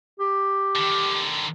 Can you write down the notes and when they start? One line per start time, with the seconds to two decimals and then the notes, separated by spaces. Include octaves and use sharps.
0.20 G4
0.76 D3 D#3